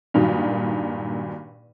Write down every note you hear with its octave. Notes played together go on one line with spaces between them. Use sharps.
G2 A#2 D#3 F#3